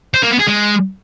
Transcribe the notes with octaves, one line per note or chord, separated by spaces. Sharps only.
C5
A#3
B3
G#4
G#3